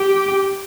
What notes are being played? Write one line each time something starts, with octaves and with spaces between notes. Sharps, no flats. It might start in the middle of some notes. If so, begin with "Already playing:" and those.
Already playing: G4